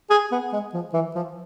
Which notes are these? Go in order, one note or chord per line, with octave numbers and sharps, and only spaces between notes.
G#4
B3
G#3
F3
E3
F3